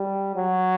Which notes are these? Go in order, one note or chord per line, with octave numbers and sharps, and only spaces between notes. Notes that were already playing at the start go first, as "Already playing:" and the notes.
Already playing: G3
F#3